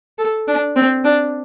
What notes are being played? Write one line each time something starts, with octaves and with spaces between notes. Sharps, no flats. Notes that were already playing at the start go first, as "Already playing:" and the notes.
A4
D4
C4
D4